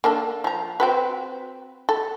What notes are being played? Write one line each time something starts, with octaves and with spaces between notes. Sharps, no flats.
A#3 D4 A4
F3 A#5
C4 F#4 B4
A4